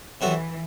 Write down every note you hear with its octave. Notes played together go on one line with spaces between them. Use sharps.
C3 E3 F#3 B3 F#4 A4